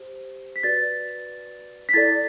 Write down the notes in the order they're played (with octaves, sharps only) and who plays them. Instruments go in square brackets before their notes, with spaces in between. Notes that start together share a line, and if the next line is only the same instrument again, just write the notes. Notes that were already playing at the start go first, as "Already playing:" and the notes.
Already playing: [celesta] G4 C5
B6
F#4 B4 D5 A6
B6
E4 A4 D5 A6